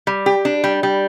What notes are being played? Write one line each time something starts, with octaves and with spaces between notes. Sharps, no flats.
G3
G4
D4
G3
G3